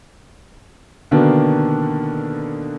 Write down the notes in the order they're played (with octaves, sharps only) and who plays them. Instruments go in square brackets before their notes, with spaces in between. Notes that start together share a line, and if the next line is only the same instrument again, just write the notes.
[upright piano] B2 D3 D#3 A#3 B3 D4